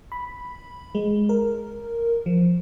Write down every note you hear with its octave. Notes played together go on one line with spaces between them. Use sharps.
B5
G#3
A#4
F3